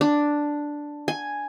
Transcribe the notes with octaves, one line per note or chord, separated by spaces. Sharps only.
D4
G#5